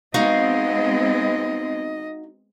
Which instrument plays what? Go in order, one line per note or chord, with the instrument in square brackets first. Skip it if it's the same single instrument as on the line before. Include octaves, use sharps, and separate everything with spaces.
[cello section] G#3 B3 C4 [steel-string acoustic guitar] D#4 F#4 F5 [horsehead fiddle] D#5